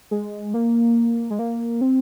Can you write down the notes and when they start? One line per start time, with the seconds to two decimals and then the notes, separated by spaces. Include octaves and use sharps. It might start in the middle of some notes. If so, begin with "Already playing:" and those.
0.11 G#3
0.54 A#3
1.30 G#3
1.39 A#3
1.81 C4